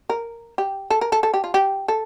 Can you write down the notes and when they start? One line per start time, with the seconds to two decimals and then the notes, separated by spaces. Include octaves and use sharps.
0.10 A#4
0.58 G4
0.90 A4
1.01 A#4
1.12 A4
1.23 A4
1.34 G4
1.44 F4
1.54 G4
1.88 A4